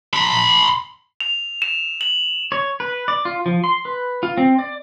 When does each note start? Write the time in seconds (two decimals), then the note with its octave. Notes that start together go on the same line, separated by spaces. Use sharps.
0.14 B5 C6
1.20 F7
1.62 E7
2.01 F#7
2.52 C#5
2.80 B4
3.08 D5
3.25 F4
3.46 F3
3.64 C6
3.85 B4
4.23 F4
4.38 C4
4.59 D5